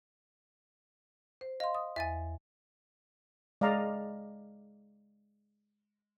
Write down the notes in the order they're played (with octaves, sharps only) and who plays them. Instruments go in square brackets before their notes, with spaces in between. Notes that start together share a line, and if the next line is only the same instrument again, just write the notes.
[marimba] C5
[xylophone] D#5 [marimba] F5 C6
[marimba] D#6
[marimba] E2 A6 [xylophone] E5 G#5
[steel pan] G#3 D5 D#5 F5 A#5